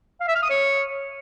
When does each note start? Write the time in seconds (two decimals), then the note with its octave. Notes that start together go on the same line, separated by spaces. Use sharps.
0.21 F5
0.28 E5
0.35 F6
0.42 D#6
0.50 C#5